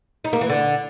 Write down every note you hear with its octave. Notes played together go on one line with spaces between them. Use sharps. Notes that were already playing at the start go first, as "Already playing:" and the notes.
D#4
A#3
E3
D3